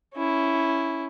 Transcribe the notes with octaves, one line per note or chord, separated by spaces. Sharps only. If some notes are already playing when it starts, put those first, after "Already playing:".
C#4 E4